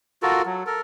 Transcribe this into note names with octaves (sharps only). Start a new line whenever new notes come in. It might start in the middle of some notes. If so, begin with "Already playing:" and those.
F4 F#4 A4 A#4
F#3
A4 A#4